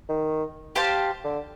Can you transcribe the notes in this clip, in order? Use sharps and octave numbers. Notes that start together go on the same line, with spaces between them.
D#3
G4 C5 F5 A5
D3